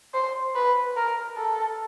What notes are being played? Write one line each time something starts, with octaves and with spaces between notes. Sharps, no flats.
C5
B4
A#4
A4